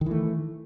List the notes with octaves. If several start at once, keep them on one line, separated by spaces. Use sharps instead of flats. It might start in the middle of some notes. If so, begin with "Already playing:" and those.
D#3 E3 A3